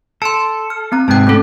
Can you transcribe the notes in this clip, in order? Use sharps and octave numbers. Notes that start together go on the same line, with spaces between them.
A4 A5 C6
F6
B3 C4 A#5
G#2 C3 B3 G5 A5
A3 C#4 A4